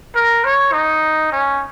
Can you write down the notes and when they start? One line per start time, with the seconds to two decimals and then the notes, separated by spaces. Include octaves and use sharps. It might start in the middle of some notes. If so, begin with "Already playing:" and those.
0.16 A#4
0.44 C#5
0.73 D#4
1.32 C#4